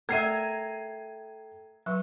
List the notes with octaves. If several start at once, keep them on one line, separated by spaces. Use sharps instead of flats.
A3 A4 A#4 E5 G5 G#6 C7 D#7
F#3 B4 C#6 E6